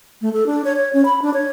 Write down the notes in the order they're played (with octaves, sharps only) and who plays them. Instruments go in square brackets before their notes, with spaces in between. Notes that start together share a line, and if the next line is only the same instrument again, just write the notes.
[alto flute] A3
A4
D4
C#5
C#5
C#4
B5
D4
C#5